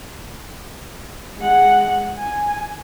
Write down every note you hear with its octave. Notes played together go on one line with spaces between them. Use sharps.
G#3 F#5
G#5